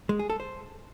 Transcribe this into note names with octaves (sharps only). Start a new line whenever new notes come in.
G#3
G#4
A4
C5